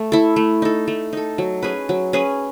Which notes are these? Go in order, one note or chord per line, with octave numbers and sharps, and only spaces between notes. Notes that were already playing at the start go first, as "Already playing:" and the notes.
Already playing: A3
E4 A4
A3
D#4 A4
A3
D#4 A4
F#3
C#4 G#4 B4
F#3
C#4 G#4 B4